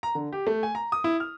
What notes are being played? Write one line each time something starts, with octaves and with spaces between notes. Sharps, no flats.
A#5
D3
G4
A3
G#5
A#5
D#6
E4
F6